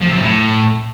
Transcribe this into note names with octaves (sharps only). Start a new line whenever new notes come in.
F3
C3
F#2
A2